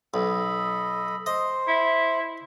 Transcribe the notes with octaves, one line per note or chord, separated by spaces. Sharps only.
B1 A4 D#5 B5
C5 D#5
E4